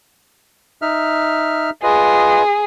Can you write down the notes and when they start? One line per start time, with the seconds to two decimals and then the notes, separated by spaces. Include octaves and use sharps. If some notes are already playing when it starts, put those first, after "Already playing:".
0.82 D#4 E5 F6
1.83 F4 G#4 B4 D#5